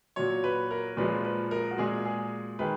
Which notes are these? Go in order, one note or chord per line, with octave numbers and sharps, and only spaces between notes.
A#2 F#3 C#5
B4
A#4
A#2 F3 G#3 B4
B4
A#4
F#4
A#2 G#3 G#4
G#4
D#3 G#3 B4